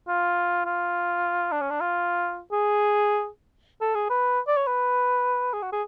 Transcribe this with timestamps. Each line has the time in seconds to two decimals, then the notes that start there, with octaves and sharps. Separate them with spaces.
0.08 F4
0.65 F4
1.52 D4
1.61 C#4
1.70 D4
1.80 F4
2.52 G#4
3.81 A4
3.95 G#4
4.10 B4
4.47 D5
4.57 C#5
4.67 B4
5.53 G#4
5.62 F#4
5.72 G#4